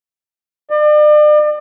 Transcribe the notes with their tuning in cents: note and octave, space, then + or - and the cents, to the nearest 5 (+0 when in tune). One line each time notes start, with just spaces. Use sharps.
D5 +40